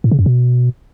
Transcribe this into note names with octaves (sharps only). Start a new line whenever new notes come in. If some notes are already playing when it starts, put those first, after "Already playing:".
A2
C#3
F#2
B2